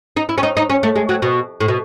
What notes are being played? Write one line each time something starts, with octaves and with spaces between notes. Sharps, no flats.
D#4
E4
C#4
D#4
D#4
C#4
A3
G#3
F#3
B2
A2
B2